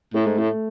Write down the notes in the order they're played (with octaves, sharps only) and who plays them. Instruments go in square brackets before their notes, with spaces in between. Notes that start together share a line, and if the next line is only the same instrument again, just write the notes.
[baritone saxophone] A2 [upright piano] A3
[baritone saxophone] G#2
[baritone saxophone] A2 [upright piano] A3